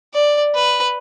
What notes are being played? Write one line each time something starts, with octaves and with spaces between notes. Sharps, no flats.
D5
B4